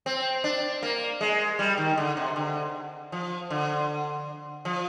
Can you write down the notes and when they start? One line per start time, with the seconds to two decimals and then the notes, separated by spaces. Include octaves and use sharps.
0.06 C4
0.44 D4
0.83 A#3
1.21 G#3
1.59 G3
1.78 D#3
1.97 D3
2.17 C3
2.36 D3
3.12 F3
3.50 D3
4.65 F3